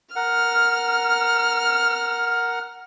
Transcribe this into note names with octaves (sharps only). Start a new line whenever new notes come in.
A#4 F#5 F6